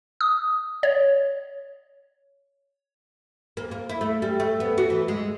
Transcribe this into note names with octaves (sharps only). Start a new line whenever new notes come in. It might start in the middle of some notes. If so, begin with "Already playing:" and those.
D#6
C#5
A#3
A#3
E4
A3
G3
A3
B3
F#4
E3
G#3